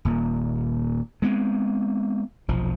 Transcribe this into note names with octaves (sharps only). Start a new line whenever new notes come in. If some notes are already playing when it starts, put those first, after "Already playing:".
D#1 A#2
G#3 B3 C4
F1 B1 F3